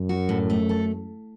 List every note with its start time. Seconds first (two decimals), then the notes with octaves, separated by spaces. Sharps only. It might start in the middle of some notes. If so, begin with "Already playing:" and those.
Already playing: F#2
0.09 F#4
0.29 A2
0.50 A3
0.69 A4